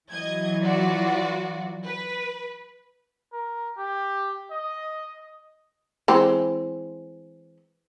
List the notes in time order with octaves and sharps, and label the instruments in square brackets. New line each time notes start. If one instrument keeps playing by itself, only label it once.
[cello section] E3 F#3 [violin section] D#5 G#6
[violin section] F4 F#4 D5
B4
[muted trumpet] A#4
G4
D#5
[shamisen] E3 G#3 C4